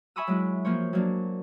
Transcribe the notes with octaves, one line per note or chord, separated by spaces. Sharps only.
E5 G#5 B5 C#6 D#6 E6
F#3 G#3 E4
F3 A#3 C5 C#5
F#3 A#3 D4